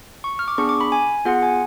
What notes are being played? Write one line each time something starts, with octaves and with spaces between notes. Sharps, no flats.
C#6
F6
D6
B3 D4 G#4 C#6
D6
B5
G#5
B3 F4 G#4 F#5
G#5